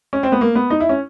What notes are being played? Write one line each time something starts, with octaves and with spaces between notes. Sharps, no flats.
C#4
C4
B3
A#3
B3
D#4
E4
C#4